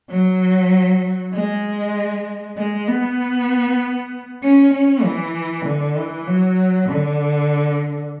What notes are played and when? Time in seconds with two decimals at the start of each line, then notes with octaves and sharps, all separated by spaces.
0.10 F#3
1.33 G#3
2.57 G#3
2.88 B3
4.43 C#4
4.74 C#4
5.04 E3
5.66 D3
5.97 E3
6.28 F#3
6.90 D3